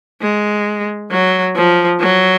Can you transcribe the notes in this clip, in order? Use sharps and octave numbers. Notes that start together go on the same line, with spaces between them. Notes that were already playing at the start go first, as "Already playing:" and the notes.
G#3
F#3
F3
F#3